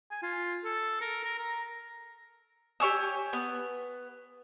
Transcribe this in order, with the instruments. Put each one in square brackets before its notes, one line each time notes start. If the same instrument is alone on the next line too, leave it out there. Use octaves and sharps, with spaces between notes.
[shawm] G#5
F4
A4
A#4
A#4
A#5
[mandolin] G4 C#5 G#5 E6
B3